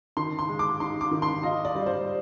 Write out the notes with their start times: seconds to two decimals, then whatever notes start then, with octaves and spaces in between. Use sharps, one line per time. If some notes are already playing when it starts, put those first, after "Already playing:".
0.17 D#3 C6
0.39 C6
0.49 G#3
0.59 D6
0.80 D#4 C6
1.01 D6
1.11 D#3
1.22 C6
1.43 F4 D#5
1.65 D5
1.75 G3
1.86 C5